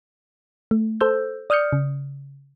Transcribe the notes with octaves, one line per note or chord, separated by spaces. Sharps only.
A3
A4 C5 E6 G6
D5 D#6 F6 G6 C#7
C#3